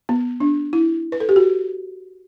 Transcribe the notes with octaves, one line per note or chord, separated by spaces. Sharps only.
B3
D4
E4
B4
A4
G4
F#4